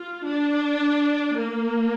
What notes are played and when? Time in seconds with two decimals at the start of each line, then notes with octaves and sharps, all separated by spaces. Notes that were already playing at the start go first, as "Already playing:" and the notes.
Already playing: F4
0.26 D4
1.36 A#3